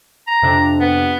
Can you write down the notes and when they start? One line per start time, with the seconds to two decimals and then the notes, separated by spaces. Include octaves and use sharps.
0.27 A#5
0.42 F2 C3 D4
0.80 B3